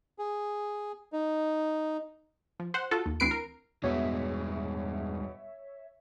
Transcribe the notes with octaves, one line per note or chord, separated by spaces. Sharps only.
G#4
D#4
F3
C5 F#5
F4 F#4 A4
D#2
D2 E3 C4 B4 C7 D7
A#4
E2 G2 B2 G#3 C#5 E5